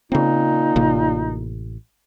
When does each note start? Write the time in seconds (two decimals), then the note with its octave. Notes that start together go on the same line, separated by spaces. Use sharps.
0.12 A#2 C#3 C4 D#4
0.76 A1 C3 A#3